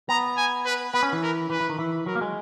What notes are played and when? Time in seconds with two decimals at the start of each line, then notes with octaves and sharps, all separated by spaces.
0.09 B3 A#5
0.37 G#5
0.65 B4
0.94 B3 B4
1.03 C#4
1.13 E3
1.23 A#4
1.50 E3 B4
1.60 E3
1.69 D#3
1.79 E3
2.06 F#3 A#4
2.15 A#3
2.21 G#3